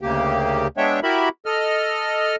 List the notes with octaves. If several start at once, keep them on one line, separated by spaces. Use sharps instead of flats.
D2 C#3 A#3 G4
G#3 B3 D4 C#5 E5 G5
E4 F#4 G4 A#4 E5 B5
A4 D#5 F6